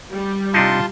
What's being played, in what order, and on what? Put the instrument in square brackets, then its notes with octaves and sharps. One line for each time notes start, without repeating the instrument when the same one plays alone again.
[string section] G3
[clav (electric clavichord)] C3 D4 D#4 [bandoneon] F4 A5 C6